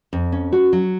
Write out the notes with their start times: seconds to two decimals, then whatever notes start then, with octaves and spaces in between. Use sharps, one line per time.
0.13 F2
0.32 C#4
0.53 F#4
0.73 F#3